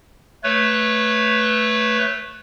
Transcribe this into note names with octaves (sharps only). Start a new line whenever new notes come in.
A3 B4 C#5